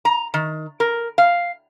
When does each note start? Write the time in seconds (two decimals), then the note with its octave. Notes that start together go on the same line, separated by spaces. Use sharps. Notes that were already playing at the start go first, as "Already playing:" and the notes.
0.05 A#5
0.34 D#3
0.80 A#4
1.18 F5